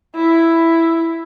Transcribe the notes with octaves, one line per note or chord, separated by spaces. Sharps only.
E4